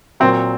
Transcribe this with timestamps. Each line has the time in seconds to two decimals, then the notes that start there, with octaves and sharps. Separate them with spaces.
0.20 A#2 F#3 C4